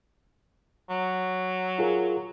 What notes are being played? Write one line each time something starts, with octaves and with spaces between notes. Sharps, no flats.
F#3
F4 G#4 A#4